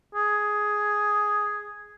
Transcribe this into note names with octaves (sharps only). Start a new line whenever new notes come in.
G#4